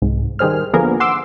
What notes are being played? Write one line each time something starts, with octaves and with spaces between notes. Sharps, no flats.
C2 G#2
D#3 G3 G#4 C5 F6
D3 F3 A#3 B3 G#4 A#4
F#5 C6 D6 E6